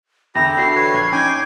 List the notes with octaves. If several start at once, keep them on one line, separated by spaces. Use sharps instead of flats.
E2 D3 E4 G4 A#6
D4 F#4 A4 C7
B4 C#5
A#1 G#6
C#4 D#4 G5 G#5 D6